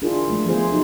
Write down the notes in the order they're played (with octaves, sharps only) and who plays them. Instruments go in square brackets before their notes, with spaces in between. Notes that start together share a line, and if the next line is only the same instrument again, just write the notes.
[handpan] D4 E4 F4 G#4 A#4
F3 A3 D4
F3 A3 B3 F4 G#4 C5
F#3 D#4 F#4